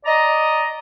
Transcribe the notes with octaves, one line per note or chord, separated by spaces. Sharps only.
D5 D#5 A#5